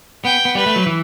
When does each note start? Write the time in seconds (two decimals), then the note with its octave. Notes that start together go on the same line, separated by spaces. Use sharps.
0.25 B3 G5
0.45 B3
0.55 G3 B4
0.66 A3
0.76 F#3
0.86 E3